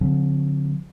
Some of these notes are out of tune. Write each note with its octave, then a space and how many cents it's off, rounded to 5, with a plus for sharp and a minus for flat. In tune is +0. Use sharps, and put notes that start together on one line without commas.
D3 -35 F3 +40 C4 +0